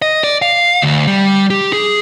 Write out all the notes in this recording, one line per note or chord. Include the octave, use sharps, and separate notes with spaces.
D#5
D5
F5
D2
G3
G4
G#4